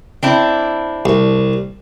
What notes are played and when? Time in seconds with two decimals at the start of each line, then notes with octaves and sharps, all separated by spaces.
0.23 C4 D4 E4
1.05 C2